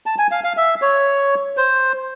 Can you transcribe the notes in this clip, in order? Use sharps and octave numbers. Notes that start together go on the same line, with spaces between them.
A5
G#5
F5
F5
E5
C#5
C5